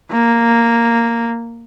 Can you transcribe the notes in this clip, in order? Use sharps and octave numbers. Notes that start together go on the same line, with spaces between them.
A#3